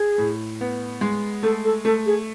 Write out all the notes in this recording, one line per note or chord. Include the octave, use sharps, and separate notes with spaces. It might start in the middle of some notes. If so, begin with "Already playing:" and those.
Already playing: G#4
A2
B3
G#3
A3 A4
A4
A3 A4
G#4